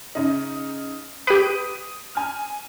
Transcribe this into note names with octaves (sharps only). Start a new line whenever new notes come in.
C#3 D#4
G4 B4 D#6 D7 D#7
G#5 F6